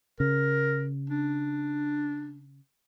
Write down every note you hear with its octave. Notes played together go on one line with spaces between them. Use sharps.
C#3 A#4
D4